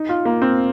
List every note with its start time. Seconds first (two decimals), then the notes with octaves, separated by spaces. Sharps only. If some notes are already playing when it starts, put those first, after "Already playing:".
Already playing: D#4
0.09 F4
0.25 A#3
0.42 C4